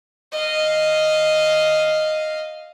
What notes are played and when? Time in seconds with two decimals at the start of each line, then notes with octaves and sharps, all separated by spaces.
0.32 D#5 F5